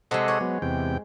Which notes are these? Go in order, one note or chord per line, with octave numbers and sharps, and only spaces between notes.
C3 G#3 A4 D#5 F#5
C#5
F#3 B3
E2 C3 G5